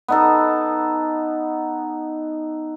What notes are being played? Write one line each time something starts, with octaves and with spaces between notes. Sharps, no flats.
B3 D#4 A4